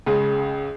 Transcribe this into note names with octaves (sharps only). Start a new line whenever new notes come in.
C#2 C#3 G#3